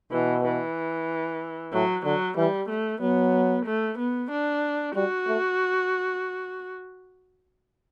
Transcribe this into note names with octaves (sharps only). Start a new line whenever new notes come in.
B2 E3
E3
A2 F#3
D3 F#3
E3 G3
A3
F#3 B3
A3
B3
D4
G3 F#4
A3